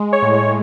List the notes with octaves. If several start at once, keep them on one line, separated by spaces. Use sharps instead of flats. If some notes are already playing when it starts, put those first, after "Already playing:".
Already playing: G#3
C#5
A2
C#5